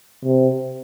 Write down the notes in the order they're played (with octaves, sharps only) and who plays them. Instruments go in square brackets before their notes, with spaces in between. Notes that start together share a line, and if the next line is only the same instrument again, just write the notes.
[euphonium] C3